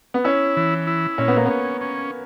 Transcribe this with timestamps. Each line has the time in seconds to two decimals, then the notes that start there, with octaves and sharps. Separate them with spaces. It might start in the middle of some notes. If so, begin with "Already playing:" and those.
0.14 B3
0.24 C#4 E4
0.57 E3
0.87 E4
1.18 A#2 C#4
1.28 B3
1.37 A#3
1.46 B3 C#4
1.81 C#4